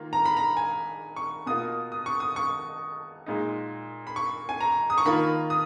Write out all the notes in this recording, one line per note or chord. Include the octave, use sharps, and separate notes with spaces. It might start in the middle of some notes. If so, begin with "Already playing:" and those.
Already playing: D#3 A#3 F4
A#5
B5
A#5
G#5
C#6
B2 A#3 F4 D#6
D#6
C#6
D#6
C#6
A#2 G#3 D#4
B5
C#6
G#5
A#5
D#6
C#6
D#3 A#3 F4 B5
D#6